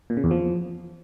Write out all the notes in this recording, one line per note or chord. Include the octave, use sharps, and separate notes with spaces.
A#2
C#3
E2
F3